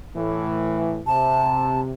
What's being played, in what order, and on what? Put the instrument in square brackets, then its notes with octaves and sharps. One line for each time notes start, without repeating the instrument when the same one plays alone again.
[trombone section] A2 E3
[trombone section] C3 [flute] A5